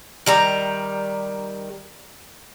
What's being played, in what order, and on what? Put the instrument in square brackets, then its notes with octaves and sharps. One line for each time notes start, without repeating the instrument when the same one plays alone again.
[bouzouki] D#3 G3 A#5